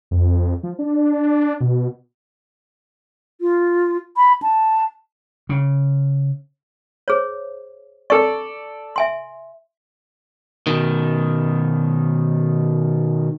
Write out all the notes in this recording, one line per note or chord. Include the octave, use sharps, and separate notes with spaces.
F2
F3
D4
B2
F4
B5
A5
C#3
G#4 C5 C#5
A4 D5 C#6
E5 G#5 C6
B2 D#3